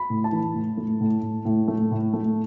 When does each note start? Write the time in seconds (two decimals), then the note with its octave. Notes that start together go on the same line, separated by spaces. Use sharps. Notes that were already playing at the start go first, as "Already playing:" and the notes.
Already playing: B5
0.10 A2
0.24 A5
0.32 E3
0.55 A2
0.77 A3
1.01 A2
1.22 A2
1.45 A2
1.68 A3
1.91 A2
2.13 A3